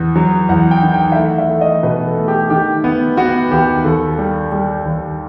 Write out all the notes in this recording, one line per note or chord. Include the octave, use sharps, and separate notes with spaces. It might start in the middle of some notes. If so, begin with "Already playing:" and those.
Already playing: E2
F#3
E2 F#5
G5
D#3
G5
E5
A3 F#5
E5
A3
D#5
B2 B4
A4
A3
G4
D#3 G4
B3
B3 F#4
D#2 G4
D#2 A4
G3
G3
D#2